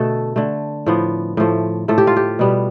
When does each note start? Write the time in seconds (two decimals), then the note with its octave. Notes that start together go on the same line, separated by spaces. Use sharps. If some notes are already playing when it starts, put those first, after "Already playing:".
Already playing: B2 D3 A3 A4
0.36 D3 A3
0.86 A2 F3 B3
1.37 A2 F3 A3
1.88 A2 F3 A3 A4
1.98 G4
2.07 F4
2.16 G4
2.39 B2 G3 B3